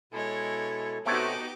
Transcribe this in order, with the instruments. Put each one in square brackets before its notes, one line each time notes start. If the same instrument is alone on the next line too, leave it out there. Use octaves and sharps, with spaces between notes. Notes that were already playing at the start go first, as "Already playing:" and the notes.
[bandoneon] B2 E4 A4 [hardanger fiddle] G#3 C#5
[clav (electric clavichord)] C3 A3 C#5 [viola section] B3 D#4 F#4 [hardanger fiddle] G4 D6